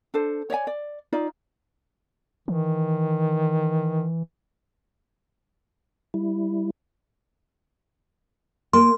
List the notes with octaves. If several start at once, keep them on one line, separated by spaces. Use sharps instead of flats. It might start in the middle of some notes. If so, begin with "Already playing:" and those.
D4 A4 C5
C#5 D5 E5 G#5
D5
D#4 F4 D5
D#3 E3
G3 E4
A#3 C6